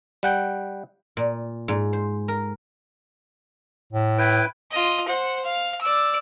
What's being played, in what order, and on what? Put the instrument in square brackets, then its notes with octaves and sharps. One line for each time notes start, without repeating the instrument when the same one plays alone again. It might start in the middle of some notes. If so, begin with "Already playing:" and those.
[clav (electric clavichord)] G3 F#5 G5
[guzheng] A#2
G#2
C5
A#4
[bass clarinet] A2
[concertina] E4 B4 G5
[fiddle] F4 D#5
C5 F#5
F5
D5 E6